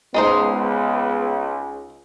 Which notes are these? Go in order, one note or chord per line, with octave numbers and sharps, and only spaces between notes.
C#2 G#3 B3 D#4 C5